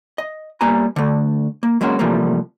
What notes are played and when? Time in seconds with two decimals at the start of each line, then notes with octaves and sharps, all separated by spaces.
0.18 D#5
0.61 G3 A#3 B3 G#5 A#5
0.96 D3 A3
1.63 A#3
1.81 F#3 G#3 A#3 C#4 F#4
1.99 C3 E3 F3 G3 A3 A#3